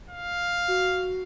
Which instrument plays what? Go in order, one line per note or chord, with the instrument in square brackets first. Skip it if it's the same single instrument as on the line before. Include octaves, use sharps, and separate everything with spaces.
[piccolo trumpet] F5
[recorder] F#4